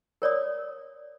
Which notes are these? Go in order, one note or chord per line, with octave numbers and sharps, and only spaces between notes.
A#4 C#5 D5 D#6